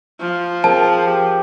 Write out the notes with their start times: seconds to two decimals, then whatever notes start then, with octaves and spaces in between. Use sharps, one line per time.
0.20 F3
0.64 C4 G#4 A#4 A5
1.06 G4